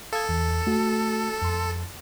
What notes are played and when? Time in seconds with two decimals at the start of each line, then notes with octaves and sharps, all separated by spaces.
0.13 A4 F5 D#6 G#6
0.29 E2
0.67 A3 F#4
1.42 F2 C6